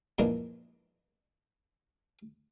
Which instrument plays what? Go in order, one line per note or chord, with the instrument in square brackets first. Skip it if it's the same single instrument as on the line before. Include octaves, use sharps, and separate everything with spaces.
[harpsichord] A#2 E3 F3 G#3 A#3 D4